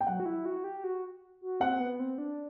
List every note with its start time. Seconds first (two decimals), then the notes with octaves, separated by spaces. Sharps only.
0.01 G5
0.07 F#3 F#5
0.20 F#4
0.26 E4
0.45 F#4
0.64 G4
0.84 F#4
1.41 F#4
1.60 C4 F#5
1.80 B3
2.00 C4
2.18 D4